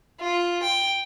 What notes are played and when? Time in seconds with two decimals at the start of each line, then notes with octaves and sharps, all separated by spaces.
0.20 F4
0.63 G5